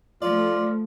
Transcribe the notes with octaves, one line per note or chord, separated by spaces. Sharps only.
F3 A3 F4 D5